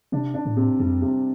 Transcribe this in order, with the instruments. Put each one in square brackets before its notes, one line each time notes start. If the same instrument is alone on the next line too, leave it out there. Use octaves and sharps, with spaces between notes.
[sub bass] C3 [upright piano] D4
[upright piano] D4
[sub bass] A2
[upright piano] C3
[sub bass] F2 [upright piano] G3
[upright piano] C3